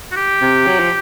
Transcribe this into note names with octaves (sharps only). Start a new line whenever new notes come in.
F#4
G4
C3
F#3
F3